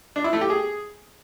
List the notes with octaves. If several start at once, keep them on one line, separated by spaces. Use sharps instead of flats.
D4
E4
A3
G4
G#4